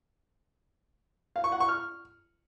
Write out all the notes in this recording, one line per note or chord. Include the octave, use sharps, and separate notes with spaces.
F5
C#6
F#5
C#6
F6